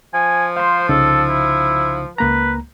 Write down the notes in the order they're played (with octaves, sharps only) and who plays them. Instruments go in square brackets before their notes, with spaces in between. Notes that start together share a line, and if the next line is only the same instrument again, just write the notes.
[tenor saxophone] F3 [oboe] G#5
[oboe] C5 [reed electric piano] F5 C6
[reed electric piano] C2 C#3 D#4 [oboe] A4
[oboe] E4
[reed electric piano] C#2 A#3 A#5 [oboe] B4